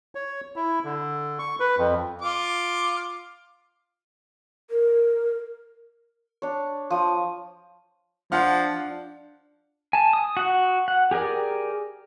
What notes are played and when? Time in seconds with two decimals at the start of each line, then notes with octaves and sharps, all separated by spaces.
0.15 C#5
0.56 E4
0.84 D3
1.39 C#6
1.60 B4
1.78 F2
2.22 F4 D6
4.71 A#4
6.42 D4 C#5
6.90 F3 D#6
8.32 F3 D4 F4 F#5 F6
9.93 G#5 A5
10.13 D#6
10.37 F#4 F#5
10.88 F#5
11.11 G4 G#4 A#4 D5